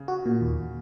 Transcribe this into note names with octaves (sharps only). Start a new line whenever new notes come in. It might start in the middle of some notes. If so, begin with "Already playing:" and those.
Already playing: C#3
F#4
A#2
D#2